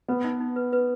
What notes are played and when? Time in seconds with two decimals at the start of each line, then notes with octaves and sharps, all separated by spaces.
0.08 B3 B4
0.24 D#4
0.40 D#4
0.56 B4
0.73 B4